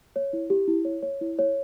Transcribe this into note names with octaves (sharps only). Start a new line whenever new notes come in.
C#5
E4
G4
E4
C#5
C#5
E4
C#5